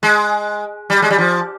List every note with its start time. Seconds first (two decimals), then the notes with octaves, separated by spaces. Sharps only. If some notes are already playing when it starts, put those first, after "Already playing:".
0.03 G#3
0.90 G3
1.02 G#3
1.10 G3
1.18 F3